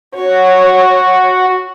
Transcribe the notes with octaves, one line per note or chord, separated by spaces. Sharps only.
F#4 C#5